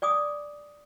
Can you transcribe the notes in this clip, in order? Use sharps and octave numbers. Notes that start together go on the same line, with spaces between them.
D5 G#5 D6 D#6